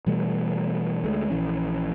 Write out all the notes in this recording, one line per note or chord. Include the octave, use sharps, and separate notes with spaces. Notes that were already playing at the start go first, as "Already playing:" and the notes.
B2 E3 G3 A3
D2 G#3 A3
A#1 E3 C#4